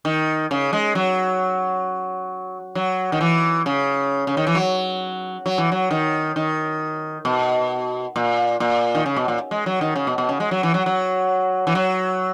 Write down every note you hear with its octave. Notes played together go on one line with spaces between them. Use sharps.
D#3
C#3
G#3
F#3
F#3
D#3
E3
C#3
C#3
D#3
E3
F#3
F#3
E3
F#3
D#3
D#3
B2
A#2
A#2
D#3
C#3
B2
A#2
G#3
F#3
D#3
C#3
B2
B2
C#3
G#3
F#3
E3
F#3
F#3
E3
F#3